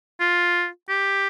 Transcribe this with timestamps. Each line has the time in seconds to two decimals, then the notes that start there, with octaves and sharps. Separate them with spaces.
0.20 F4
0.89 G4